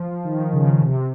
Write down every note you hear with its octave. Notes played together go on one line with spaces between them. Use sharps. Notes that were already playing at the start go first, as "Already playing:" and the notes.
Already playing: F3
D#3
C#3
C3